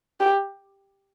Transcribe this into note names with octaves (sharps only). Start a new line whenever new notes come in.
G4